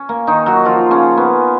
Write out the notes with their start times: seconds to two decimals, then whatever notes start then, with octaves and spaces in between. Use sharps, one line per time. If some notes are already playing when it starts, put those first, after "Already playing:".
Already playing: C#4
0.09 A#3
0.27 D#3 D#4
0.46 F#3 F#4
0.65 F3 F4
0.91 C#3 C#4
1.17 B3